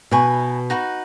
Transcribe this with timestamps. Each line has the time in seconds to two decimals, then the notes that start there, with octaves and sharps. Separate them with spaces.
0.11 B2 D#4 B4 G#5 C#6
0.70 D#4 F#4 B4